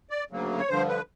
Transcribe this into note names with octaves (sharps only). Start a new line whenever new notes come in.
D5
D2 C#3 F#3 A#3
C#5
G2 D3 F3 C5
B4